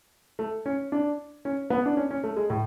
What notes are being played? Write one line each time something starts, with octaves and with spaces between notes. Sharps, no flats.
A3
C#4
D4
C#4
B3
D4
C#4
C#4
A3
G#3
A2